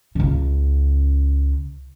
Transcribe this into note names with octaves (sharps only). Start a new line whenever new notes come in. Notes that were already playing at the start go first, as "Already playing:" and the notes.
C#2 C#3